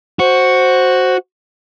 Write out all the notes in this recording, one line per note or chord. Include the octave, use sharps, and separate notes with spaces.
F#4 C5